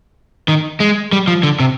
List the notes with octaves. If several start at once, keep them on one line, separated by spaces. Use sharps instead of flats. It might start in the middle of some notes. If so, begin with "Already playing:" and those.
D#3
G#3
G3
F3
D3
C3